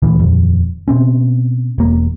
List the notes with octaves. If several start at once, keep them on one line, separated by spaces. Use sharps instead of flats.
D#1 D2 E3
D#1 F2
B2 C4 C#4
E1 A#3